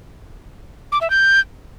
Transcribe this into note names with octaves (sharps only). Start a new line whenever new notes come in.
D6
E5
G6